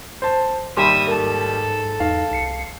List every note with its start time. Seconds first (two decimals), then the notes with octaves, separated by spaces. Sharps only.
0.22 C5 A5
0.77 D#2 G#2 G3 E5 G5 B5 C6 D#6
1.08 A4 A#4
2.00 E2 D#4 F5
2.31 C2 C7 C#7